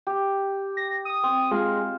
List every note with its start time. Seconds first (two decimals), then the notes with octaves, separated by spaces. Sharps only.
0.07 G4
0.77 A#6
1.05 D#6
1.23 C4
1.51 G#3 F4